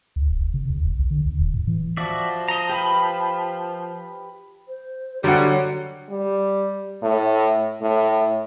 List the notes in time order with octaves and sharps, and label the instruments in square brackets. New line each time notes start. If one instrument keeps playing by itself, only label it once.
[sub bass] D2
D1
F#1
C#3
D#2
E1
B1
D3
D#2
D#1
A2
E3
[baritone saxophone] F3 [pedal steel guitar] F#4 D5 E5
[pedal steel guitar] D#5 A#5
G4 B4 B5
[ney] C5
[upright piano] D3 F#5 [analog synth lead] F#3 [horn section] G3 [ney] F#4
[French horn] G3
A2
A2